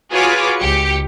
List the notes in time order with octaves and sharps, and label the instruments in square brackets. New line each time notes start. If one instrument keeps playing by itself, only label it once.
[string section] F4 F#4 G#4 B4 C#5 D6
C#2 G4 C#7